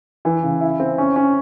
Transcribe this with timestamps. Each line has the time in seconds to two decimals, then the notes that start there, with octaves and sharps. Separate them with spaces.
0.25 E3
0.43 C#3
0.61 E4
0.80 C4
0.98 C#4
1.16 C#4